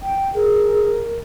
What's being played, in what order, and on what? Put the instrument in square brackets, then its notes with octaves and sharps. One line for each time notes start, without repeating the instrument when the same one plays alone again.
[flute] G5
[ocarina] G#4 [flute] A#4